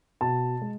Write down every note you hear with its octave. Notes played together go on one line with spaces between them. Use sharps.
B2 A5
G#3